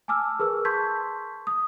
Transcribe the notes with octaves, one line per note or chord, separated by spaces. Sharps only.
G#5 A5 D6 E6 F6
G#4 A#4 B4 E6
A5 C6 C#6 G6 G#6 B6
D#6